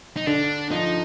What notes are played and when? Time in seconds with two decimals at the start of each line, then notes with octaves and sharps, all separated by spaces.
0.17 D#4
0.26 D3 D4
0.71 F3 D#4